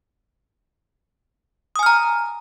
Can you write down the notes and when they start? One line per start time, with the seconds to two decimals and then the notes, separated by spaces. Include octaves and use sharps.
1.76 D#6
1.79 G#5
1.83 F6
1.86 A#5